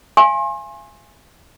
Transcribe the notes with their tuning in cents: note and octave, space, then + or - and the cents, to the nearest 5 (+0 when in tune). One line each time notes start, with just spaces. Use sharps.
F5 -45 G#5 +0 C6 +40